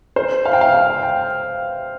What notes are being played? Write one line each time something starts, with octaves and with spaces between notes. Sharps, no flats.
C5
F5
G5
F5
F5
G5